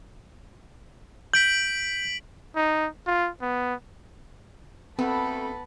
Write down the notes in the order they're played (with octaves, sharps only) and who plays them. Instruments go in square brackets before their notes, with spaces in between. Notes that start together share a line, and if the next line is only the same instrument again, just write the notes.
[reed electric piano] G6 [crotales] B6 D7 F#7
[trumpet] D#4
F4
B3
[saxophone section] D2 A3 A4 [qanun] B3 [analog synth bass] C4 [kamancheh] A5 B5